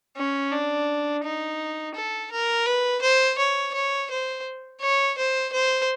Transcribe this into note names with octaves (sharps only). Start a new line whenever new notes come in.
C#4
D4
D#4
A4
A#4
B4
C5
C#5
C#5
C5
C#5
C5
C5